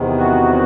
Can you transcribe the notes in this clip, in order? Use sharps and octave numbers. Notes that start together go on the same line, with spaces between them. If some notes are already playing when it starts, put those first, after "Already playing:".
Already playing: E2 C3 D#3
F#4